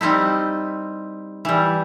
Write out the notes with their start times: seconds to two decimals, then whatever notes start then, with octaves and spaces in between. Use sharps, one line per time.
0.01 G3 C4 D#4 E4
1.45 E3 G3